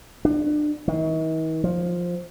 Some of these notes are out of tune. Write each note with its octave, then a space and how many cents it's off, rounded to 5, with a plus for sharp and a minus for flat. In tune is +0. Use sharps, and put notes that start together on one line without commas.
D4 +30
D#3 +45
F3 +10